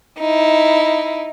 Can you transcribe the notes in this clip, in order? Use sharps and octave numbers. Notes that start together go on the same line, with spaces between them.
D#4 E4